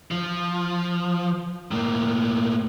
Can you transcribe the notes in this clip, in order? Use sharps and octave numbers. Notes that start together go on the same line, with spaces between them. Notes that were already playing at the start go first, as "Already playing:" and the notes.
F3
A2 A#3